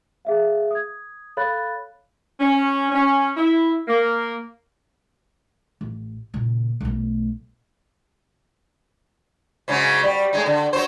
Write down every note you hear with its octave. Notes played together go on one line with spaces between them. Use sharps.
G#4 E5 F5
D#6 G#6
A4 C#5 F5 B5 F#6 A6
C#4
C#4
E4
A#3
A1
A#2 C#3
B1 A3
G#2 C#3 F#3
G3
A2 G#3 D#4
D3
F#3 C5